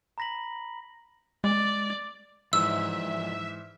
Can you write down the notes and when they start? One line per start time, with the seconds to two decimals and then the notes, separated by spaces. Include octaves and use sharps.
0.18 A#5 B5 A#6 B6 F#7
1.44 G#3 D5
2.53 G#2 E3 F3 D#4 D5 E5 E6